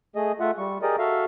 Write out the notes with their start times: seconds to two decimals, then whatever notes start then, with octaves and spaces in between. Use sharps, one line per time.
0.16 A3 G#4 D#5
0.40 A3 F4 E5 F#5
0.58 G3 C#6
0.82 G4 G#4 A#4 D5 D#5
0.99 F#4 A4 E5 F5